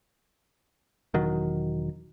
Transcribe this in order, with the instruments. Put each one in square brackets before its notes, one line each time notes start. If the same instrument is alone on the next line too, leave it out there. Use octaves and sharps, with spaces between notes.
[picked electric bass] E1 D#3 F#3